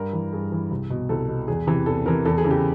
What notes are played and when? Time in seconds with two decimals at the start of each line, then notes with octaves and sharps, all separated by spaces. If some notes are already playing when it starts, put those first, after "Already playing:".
Already playing: G2 A#4
0.13 E3
0.33 G2 G#4
0.52 E3
0.71 C2
0.90 B2
1.09 C2 A4
1.29 B2
1.48 E2 G#4
1.67 C3 E3
1.86 E2 A4
2.06 C3 E3 A#4
2.25 E2 A4
2.38 G#4
2.44 C#3 E3
2.51 G4